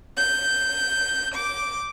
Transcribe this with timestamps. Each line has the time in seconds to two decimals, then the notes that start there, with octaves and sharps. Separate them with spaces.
0.16 G6
1.34 D6